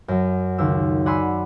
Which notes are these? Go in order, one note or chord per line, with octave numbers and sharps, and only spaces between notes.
F#2 F#3
C#2 D#3 E6
D5 F#5 G#5 B5 C6 E6